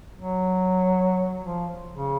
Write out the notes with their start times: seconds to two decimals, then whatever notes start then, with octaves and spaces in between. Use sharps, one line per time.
0.16 F#3
1.42 F3
1.92 C#3